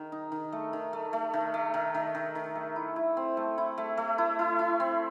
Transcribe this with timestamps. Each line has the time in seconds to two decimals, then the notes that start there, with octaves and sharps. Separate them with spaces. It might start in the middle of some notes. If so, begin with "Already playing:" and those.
Already playing: D#3
0.12 D#4
0.32 D#3
0.52 A3
0.73 D#3
0.93 A3
1.13 A3
1.34 D#3
1.54 A3
1.74 D#3
1.94 D#3
2.15 D#3
2.35 D#3
2.55 A3
2.76 E4
2.96 E4
3.17 C4
3.37 A3
3.58 E4
3.78 A3
3.97 A3
4.18 E4
4.39 E4
4.59 E4
4.80 C4